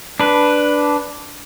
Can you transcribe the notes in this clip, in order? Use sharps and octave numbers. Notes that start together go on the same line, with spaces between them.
D4 B4